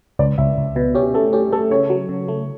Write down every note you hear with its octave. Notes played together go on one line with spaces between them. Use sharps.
C#2 D5
C#2 E5
C#2
B2 B4
C#4 G4
A3 A4
C#4 G4
A3 A4
C#3 C#5
F#3
C#3
A3